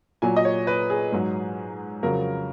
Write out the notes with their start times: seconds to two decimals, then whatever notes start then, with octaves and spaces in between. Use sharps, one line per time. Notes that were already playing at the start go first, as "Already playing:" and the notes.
0.22 A#2 F#3 G#5
0.36 D#5
0.45 C#5
0.67 B4
0.90 G#4
1.12 G#2 F#3
2.03 F2 C#3 F#3 A#4